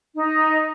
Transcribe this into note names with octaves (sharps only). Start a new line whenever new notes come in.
D#4